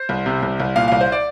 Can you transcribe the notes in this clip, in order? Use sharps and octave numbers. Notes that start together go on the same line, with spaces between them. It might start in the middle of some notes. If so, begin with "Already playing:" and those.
Already playing: C5
C2
C3
C2
C2
A#2 F5
C2 F5
C5
D5